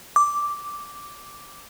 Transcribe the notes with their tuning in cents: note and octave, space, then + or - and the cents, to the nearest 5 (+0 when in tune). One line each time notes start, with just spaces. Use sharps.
D6 -5